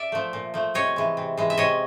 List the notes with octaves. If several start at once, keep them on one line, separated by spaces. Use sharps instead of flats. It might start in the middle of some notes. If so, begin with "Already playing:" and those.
Already playing: D5 E5
F3 A3
A#2
F3 A3
C3 C#5 D#5
E3 G#3
C3
E3 G#3
E5
C3 C#5 D#5